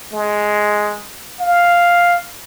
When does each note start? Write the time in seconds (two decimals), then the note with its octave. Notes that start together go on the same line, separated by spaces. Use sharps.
0.13 G#3
1.40 F5